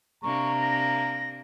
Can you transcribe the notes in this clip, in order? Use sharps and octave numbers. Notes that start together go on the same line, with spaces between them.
C3 A#3 D4 A#5 C#6
A#6